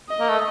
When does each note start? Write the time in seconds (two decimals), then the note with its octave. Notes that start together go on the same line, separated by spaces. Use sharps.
0.09 D#5
0.19 A#3
0.28 A3